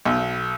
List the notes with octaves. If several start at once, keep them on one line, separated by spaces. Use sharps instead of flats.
B1